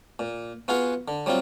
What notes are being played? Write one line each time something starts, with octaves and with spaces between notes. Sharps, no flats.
A#2
B3 F4 F#4 G#4 F5 F#5
D3
F#3 G3 C4 F4